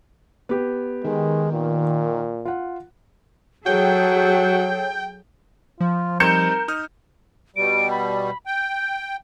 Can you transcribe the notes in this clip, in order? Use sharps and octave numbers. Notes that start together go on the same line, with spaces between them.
B3 G4
D#3 G#3
A#2
F4 F#5
F#3 F#4 G#4 A4 C#5 G5
F3 F4
G3 C4 D#4 A#4 G6 C#7 E7
D#4 D#6 F6
B2 G3 D7
B5
G5 G6